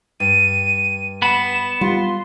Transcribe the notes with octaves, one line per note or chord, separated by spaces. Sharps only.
G2 D#7
B3 B5 E7
G3 F4 C6